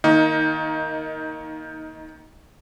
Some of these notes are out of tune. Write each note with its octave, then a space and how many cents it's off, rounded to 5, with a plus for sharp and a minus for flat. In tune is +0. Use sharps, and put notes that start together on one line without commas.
D#3 +0 A#3 +0 D#4 +20